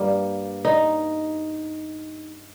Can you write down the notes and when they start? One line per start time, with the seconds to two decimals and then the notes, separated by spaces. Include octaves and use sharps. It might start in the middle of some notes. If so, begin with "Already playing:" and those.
Already playing: G2 G3 A#3
0.65 D#4